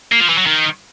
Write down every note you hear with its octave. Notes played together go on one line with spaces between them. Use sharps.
A#3
F3
E3
F#3
D#3